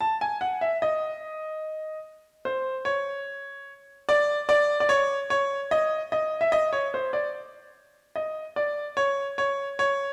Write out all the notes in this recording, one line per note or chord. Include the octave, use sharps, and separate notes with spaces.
A5
G#5
F#5
E5
D#5
C5
C#5
D5
D5
D5
C#5
C#5
D#5
D#5
E5
D#5
C#5
C5
D5
D#5
D5
C#5
C#5
C#5